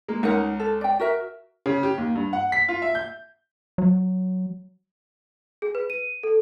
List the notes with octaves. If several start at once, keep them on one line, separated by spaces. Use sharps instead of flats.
G#3 A#3
C#2 D#4 A#4 F#5
A4
D5 G5
F#4 A#4 E5
C#3
G4
D#2
G2
F#5
B6
F4
E5
G6
F#3
G#4
B4
D#7
A4